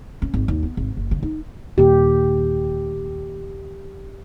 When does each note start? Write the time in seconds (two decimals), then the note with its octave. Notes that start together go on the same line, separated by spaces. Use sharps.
0.22 C#4
0.34 G#1
0.48 D#2
0.63 B3
0.77 G#1
0.97 F#1
1.11 C#3
1.23 D#4
1.78 D#2 A#2 G4